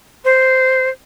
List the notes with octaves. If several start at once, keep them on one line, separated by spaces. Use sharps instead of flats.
C5